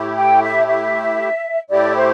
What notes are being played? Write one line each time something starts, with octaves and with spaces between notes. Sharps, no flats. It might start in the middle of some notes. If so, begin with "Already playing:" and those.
Already playing: A2 A3 E4 G4
G5
E5
E5
A2 A3 E4 G4 D5
C5